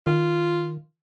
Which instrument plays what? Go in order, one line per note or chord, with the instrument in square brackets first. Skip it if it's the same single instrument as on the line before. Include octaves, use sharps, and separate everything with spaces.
[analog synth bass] D#3 [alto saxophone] F4